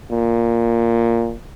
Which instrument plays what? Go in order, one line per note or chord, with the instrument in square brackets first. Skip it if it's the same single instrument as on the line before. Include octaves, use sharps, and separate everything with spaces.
[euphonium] A#2